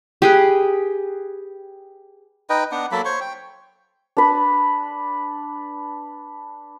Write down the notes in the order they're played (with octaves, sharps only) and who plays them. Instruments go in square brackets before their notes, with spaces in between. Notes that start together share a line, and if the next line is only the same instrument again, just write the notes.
[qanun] G4 G#4 B4
[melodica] D#4 B4 D#5 G5
B3 D4 F#5
F#3 A#3 A4 B5
C5 C#5 C#6
G5
[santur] D4 B4